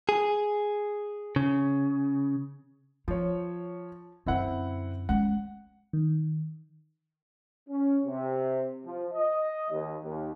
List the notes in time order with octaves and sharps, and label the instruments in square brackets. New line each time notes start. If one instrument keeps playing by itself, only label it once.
[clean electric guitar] G#4
C#3
[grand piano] F3 C#5 [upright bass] F4
[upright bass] F#2 D3 [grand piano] C4 E4 F#5
[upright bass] G#3 C#4 [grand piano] F#5
[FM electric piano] D#3
[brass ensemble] C#4
C3
F3
D#5
D#2
D#2